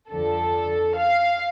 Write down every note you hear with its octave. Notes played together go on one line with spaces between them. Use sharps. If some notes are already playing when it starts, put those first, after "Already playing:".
F2 D3 F3 A4
F5